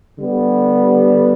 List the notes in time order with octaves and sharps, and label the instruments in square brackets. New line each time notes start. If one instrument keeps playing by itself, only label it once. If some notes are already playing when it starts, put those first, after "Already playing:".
[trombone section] D3 G3 B3